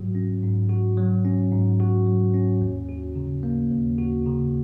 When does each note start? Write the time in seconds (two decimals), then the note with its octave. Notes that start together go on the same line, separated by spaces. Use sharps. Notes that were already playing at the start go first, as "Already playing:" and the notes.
Already playing: G#2 F#3 F#4
0.15 C#4
0.43 G#2
0.69 F#4
0.97 F#3
1.25 C#4
1.52 G#2
1.80 F#4
2.06 F#3
2.34 C#4
2.61 D#2
2.89 F#4
3.16 C#3
3.43 A#3
3.71 D#2
3.98 F#4
4.26 C#3